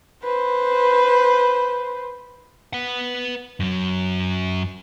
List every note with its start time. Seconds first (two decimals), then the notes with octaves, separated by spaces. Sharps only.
0.24 B4 C5
2.73 B4 F#5
3.60 F#2 F#3